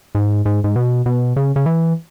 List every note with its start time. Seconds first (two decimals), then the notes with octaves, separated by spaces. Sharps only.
0.15 G#2
0.45 G#2
0.64 G#2
0.76 B2
1.06 B2
1.36 C#3
1.56 C#3
1.66 E3